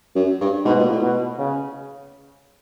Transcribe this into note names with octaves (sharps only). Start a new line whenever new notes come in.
F#2
G2
G#2 B2
A#2
A2
B2
C#3